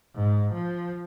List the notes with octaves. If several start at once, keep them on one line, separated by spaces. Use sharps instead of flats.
G#2
F3